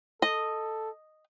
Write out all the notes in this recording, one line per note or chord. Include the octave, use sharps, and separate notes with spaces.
A4 D#5